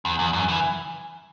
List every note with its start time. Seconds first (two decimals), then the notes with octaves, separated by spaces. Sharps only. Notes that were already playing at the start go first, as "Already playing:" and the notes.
0.05 E2
0.19 E2
0.33 F#2
0.48 E3